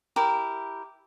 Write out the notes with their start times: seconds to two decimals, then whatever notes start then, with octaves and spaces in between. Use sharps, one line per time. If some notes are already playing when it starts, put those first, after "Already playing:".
0.16 E4 G4 A#4